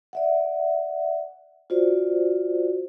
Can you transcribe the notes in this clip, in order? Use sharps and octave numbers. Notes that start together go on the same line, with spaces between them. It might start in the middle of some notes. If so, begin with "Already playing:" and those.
D5 E5 F#5
F4 F#4 C5 D5